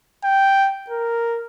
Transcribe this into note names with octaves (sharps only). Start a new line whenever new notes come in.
G5
A#4